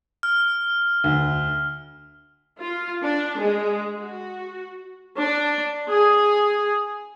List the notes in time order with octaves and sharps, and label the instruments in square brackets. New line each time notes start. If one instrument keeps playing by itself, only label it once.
[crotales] F6
[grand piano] D2
[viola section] F4
D4
G#3
F#4
D4
G#4